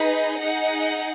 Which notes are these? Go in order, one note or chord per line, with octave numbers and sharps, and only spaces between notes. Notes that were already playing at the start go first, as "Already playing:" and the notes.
Already playing: D#4 G#4 B4 D#5
D#4 G#4 D#5 F#5